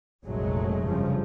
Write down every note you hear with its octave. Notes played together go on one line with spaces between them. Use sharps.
F1 A#1 F#3 G#3 A3
G2 C#3 F3